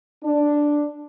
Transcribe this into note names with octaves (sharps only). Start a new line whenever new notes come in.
D4